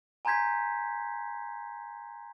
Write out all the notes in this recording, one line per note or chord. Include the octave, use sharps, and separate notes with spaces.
G#5 A#5 C6 G6 G#6 B6